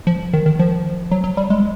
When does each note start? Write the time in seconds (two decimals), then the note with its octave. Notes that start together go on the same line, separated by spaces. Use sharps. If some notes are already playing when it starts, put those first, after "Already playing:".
0.07 F3
0.33 D#3
0.46 D#3
0.59 F3
1.11 F#3
1.24 F#3
1.37 G3
1.50 G#3